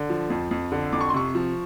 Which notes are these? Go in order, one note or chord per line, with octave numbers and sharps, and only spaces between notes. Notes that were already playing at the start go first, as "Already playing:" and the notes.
Already playing: D3
F3
F2
F2
D3
F2 D6
C#6
C6
C3 C#6
F3